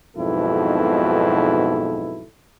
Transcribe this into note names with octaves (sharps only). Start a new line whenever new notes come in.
B1 F2 G#2 B2 E4 A4